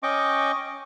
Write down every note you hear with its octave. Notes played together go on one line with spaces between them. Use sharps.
C#4 D#5 G5 C#6 D6